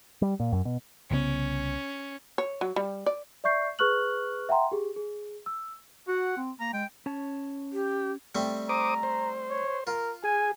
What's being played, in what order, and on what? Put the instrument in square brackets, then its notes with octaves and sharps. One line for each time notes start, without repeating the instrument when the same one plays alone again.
[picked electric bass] G3
A#2
F#2
B2
[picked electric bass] C2 C#3 B3 [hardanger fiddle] C#4
[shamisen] C#5
F#3
G3
D5
[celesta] D5 E5 C#6 G6 C7
G#4 B4 C#6 F6 F#6 F#7
E5 F#5 G5 A#5 C6
G4 G#4
G#4
E6
[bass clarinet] F#4 [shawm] F#5
[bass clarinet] C4
[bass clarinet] A#3 [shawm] A#5
[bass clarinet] G#3 [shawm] G5
[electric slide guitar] C#4 C#5 A5
[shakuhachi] G4
[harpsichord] G3 A3 C4
[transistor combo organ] C5 D6 D#6 [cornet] A#5
[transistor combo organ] C5
[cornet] C#5
[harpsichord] F4 [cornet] A#4
[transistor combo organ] G#4 [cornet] G#5